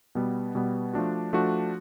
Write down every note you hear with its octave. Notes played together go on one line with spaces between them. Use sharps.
B2 G3 B3
B2 G3 B3
F3 A3 D4 F#4
F3 A3 D4 F#4